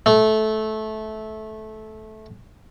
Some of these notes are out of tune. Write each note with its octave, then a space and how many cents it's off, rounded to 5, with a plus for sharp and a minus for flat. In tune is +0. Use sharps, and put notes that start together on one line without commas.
A3 -15